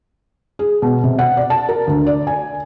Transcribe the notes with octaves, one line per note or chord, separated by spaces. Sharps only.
G#4
B2
C3
F#5
D5
A5
A#4
D2
D5
G#5